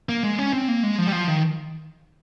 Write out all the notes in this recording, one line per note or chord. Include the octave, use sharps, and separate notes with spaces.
A#3
G#3
C#4
C4
A#3
G#3
F3
G3
F3
D#3